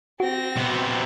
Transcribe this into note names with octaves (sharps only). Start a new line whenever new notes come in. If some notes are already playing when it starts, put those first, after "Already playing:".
C4 F#4 A#6
C3 B3